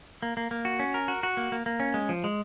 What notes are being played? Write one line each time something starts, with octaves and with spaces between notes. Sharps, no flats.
A#3
A#3
A#3
F#4
C#4
A#4
F#4
F#4
A#3
A#3
A#3
C#4
G#3
F3
G#3